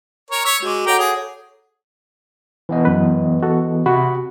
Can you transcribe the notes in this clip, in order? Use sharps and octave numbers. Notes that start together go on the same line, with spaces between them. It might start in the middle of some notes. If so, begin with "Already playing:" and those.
A#4 C#5
C#5 E6 B6
G#3 F#4 D6
A4 C#5 F#5 G5 A#5 D6
G#4 C#5
E3 B3 D#5
F#2 B4
F#4 A4
C3 F#4 B5